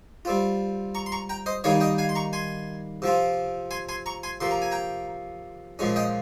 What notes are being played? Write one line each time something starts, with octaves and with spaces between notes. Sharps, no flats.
G3 C4 F4
A#5 C#6
C6
A#5 C#6
G5 A#5
C5 D#5
D#3 G3 A#3 D#4 C#5 F5
D#5 G5
F5 G#5
C6
A#5 C#6
G#5 C6
C3 F3 C4 F4
G#5 C6
G#5 C6
A#5 C#6
G#5 C6
C3 F3 A#3 C6
A#5
G#5
G5 A#5
A#2 F3 G#3 C#4
D#5 G5